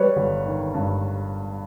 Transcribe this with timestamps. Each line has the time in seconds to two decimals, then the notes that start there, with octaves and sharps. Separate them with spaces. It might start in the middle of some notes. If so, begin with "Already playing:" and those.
Already playing: G3 B4 C#5
0.16 G1
0.46 D#3
0.74 G2